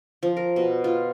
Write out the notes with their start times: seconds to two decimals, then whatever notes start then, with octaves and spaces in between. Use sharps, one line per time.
0.23 F3
0.37 A#4
0.56 B2
0.84 F4